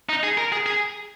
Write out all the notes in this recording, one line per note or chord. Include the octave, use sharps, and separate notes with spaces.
D#4
G#4
A#4
G#4
G#4